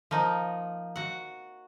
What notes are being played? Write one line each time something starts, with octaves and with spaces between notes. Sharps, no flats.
F3 A#3 D#4
F#4 F#5